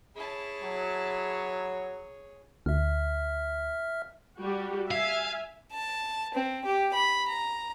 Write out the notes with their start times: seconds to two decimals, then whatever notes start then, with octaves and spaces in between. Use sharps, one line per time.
0.16 E4 G#4 C#5 A5
0.63 F#3
2.66 D2 E5 F6
4.40 G3 F#4 G4
4.91 E5 F5 G#5
5.72 A5
6.34 C4
6.65 G4
6.94 B5
7.28 A#5